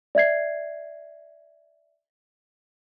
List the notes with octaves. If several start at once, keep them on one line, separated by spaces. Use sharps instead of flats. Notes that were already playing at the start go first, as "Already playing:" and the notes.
D5 E5 G#6 C7